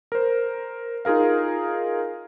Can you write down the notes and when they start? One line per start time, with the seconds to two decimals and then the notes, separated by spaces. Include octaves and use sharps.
0.12 A#4 C5
1.05 D#4 F4 G#4 A#4 F5